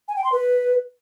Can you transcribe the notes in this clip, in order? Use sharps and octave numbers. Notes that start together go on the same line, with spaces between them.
G#5
G5
C6
B4